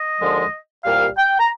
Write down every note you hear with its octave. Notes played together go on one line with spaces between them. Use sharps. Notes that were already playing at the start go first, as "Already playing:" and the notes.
Already playing: D#5
D#2 D3 F3 G#3
C2 A#2 G3 F5
G5
A#5